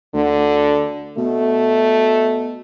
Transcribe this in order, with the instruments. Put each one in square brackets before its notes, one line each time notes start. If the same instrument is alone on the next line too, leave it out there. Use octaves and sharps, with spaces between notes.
[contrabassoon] D2 [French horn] D3
[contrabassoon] B2 [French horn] A3